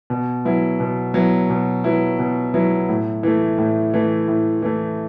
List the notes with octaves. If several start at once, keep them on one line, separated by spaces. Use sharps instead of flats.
B2
F#3 B3 E4
B2
F#3 B3 E4
B2
F#3 B3 E4
B2
F#3 B3 E4
A2
E3 A3
A2
E3 A3
A2
E3 A3